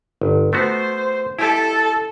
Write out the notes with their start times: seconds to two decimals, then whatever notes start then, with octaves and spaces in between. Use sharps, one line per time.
0.22 G1
0.53 A3 B3 F#4 C5
1.39 E4 G4 A4 A5